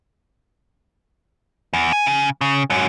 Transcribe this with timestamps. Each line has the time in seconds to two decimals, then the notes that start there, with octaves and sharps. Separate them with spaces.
1.73 E2
1.92 G#5
2.06 C#3
2.41 C#3
2.70 G#2 F#3